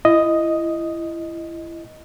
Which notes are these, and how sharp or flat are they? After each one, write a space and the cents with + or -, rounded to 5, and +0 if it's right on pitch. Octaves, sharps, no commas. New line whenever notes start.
E4 +25 D#5 +0